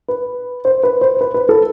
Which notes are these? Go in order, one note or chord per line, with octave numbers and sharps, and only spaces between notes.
B4
C5
B4
C5
B4
B4
A4